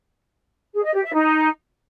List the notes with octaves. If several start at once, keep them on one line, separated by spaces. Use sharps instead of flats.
G#4
D#5
G4
E5
D#4